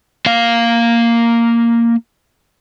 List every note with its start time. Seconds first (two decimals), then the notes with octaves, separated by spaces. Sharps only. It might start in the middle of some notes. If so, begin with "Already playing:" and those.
0.26 A#3 F5